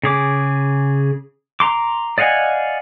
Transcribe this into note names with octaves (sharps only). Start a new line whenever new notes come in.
C#3 G#4 D6
A#5 C6 D6
D5 D#5 F5 F#5 G#5